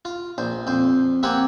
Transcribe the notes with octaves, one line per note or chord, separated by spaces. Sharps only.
F4
A#1 C5
F2 C5
A#3 C4 G4 C5 F#5 G#5